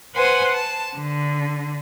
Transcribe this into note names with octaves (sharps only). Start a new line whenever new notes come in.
B4 C5 F#5 G#5 C6
A5
D3